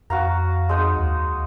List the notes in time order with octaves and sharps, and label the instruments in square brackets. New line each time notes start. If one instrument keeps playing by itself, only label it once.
[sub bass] F2 [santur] F#4 F5 A#5
[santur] G#3 D#4 D#6
[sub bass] D#2